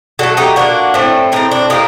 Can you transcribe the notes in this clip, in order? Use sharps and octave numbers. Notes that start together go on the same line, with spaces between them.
D3 F#3 A3 F#4 A4
D#4 G4
A#2 G3 A#3 D4 F#4
A2 A3 C4
A2 A3 C4 D#4
D4
A2 G3 A#3 D#4